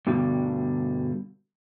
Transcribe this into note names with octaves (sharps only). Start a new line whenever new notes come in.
G2 B2 D3 G3